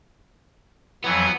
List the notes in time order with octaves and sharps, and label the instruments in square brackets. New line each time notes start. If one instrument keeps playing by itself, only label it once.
[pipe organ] F2 E3 F#3 [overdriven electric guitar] B3